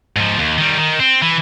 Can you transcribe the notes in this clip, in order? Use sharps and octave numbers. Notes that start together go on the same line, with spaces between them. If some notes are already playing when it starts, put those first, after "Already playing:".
G#2 F3
D#2
D#3 G3
D#3
C4
E3